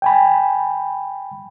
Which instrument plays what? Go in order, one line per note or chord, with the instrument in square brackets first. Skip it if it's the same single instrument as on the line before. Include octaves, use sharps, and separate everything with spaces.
[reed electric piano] G5 G#5 B5